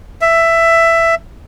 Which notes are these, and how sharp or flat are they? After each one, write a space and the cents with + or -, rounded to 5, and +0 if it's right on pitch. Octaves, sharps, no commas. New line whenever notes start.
E5 +10